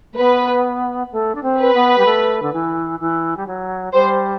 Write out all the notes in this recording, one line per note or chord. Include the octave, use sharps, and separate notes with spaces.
A3
B3 B4
A3
D4
C4
B4
B3
G3
A3
D3
E3
E3
G3
F#3
G3 C5